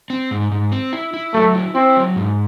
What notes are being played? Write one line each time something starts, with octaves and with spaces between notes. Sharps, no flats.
C4
G#2
G#2
C4
E4
E4
F#3 A3
E4
C4 E4
F#3
G#2